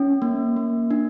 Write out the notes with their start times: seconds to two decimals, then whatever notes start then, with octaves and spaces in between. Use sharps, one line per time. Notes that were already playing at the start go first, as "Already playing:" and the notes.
Already playing: C#4
0.22 A#3
0.56 A#3
0.91 D4